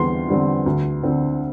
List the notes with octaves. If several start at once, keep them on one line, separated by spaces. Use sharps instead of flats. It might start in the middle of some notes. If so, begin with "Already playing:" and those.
Already playing: E2 D3 G3 C4 C6
D3 G3 C4
D2
D3 C4